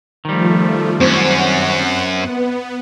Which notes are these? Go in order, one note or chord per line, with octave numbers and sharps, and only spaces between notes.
D#3 F3 G3 A3
F#2 C4 C#4 F#5
B3